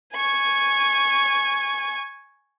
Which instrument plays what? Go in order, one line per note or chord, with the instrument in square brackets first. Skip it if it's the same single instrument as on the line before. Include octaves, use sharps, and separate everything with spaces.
[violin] G#5 C#6